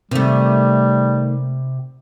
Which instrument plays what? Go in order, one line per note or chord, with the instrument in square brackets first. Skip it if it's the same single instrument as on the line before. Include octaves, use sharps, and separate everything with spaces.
[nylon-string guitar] C3 [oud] D#3 A3 [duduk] G3